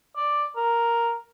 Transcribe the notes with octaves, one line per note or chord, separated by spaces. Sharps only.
D5
A#4